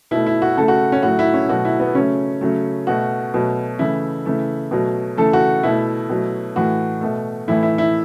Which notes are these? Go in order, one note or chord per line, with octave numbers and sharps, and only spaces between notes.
B2 A3 E4
E4
F#4
C#3 A3 A4
F#4
C#4
A2 F#3 A3 F#4
E4
C#4
B2 F#3 A3 F#4
E4
B3
C#3 F#3 A3 C#4
C#3 F#3 A3
B2 A3 F#4
B2 F#3 A3
C#3 E3 A3 E4
C#3 E3 A3
B2 F#3 A3
C#3 E3 A3 A4
F#4
B2 A3 E4
B2 F#3 A3
A2 E3 A3 F#4
B2 A3
A2 E3 A3 E4
E4
E4